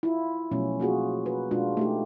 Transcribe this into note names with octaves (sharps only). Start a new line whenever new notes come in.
E4 F4
B2 F3 F#3 A3 C#4
A#3 F4 F#4 G#4
F#4 A#4 B4
B2 G#3 D4 F4 F#4
A3 D#4 G4